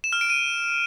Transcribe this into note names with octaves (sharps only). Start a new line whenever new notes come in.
E7
F6
D7
D#7